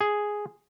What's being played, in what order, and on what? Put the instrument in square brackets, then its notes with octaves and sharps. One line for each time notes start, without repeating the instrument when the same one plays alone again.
[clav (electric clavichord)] G#4